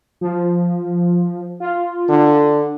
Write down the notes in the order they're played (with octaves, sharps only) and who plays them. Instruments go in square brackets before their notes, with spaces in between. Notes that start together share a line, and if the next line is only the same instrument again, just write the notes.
[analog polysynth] F3
F4
[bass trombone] D3